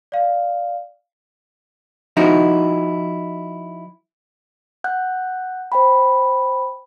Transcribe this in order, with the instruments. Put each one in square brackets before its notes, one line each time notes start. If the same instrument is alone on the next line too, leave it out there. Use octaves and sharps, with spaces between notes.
[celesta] D5 F5
[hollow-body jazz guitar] F3 D#4 E4 F#4
[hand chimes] F#5 F#6 G6
C5 G5 B5